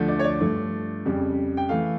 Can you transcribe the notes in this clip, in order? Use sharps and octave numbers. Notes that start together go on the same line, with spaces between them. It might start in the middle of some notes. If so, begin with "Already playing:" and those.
Already playing: D2 D3 F3 A3
D5
C#5
D5
G2 F3 A3
F2 C#3 G3
G5
E3 A3 F5